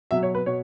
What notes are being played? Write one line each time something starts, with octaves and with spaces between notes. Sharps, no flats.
B2 F#3 E5
C#5
B4
B2 C#5